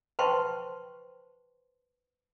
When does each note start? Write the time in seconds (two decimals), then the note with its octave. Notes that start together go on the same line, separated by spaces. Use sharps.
0.19 B4 C5 G5 A5 C6 C#6